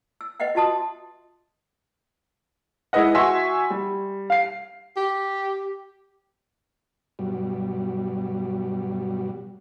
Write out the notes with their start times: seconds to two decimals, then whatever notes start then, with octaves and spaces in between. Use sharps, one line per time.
0.21 E6
0.40 B4 D#5 E5 F#5 G5
0.55 F4 F#4 D#5 A5 C6 D#6
2.93 G#3 E4 B4 D#5 F#5
3.15 F#4 E5 F#5 G#5 C6 C#6
3.70 G3
4.30 F5 C7
4.97 G4
7.19 G2 B2 F#3 G3